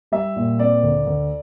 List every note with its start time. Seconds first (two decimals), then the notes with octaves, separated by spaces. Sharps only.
0.12 G3 E5
0.36 A#2
0.59 C4 D5
0.83 D2
1.06 D2